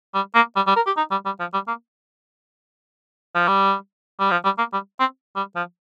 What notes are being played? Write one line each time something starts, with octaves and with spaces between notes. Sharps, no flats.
G3
A#3
G3
G3
A#4
G4
D#4
G3
G3
F3
G3
A#3
F3
G3
G3
F3
G3
A#3
G3
C4
G3
F3